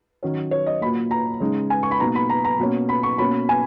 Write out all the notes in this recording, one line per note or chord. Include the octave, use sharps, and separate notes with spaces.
D#3 F#3 C#4
C#5
D#5
A#2 F#3 A#3 B5
A#5
C#3 G#3 D#4
G#5
C#6
B5
B2 A#3 D#4 A#5
B5
A#5
A#5
B2 A#3 C#4
B5
C#6
B2 A#3 C#4 B5
G#5